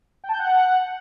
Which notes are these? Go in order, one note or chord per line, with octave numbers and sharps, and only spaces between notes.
G5
A5
G6
F#5